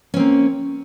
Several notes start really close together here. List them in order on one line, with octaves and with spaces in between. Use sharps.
C#4 C4 A#3